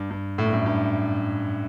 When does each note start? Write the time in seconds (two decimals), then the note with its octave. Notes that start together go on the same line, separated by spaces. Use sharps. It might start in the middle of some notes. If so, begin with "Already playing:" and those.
Already playing: G2
0.10 G2
0.38 A2
0.46 G2
0.53 F#2 A2
0.66 G2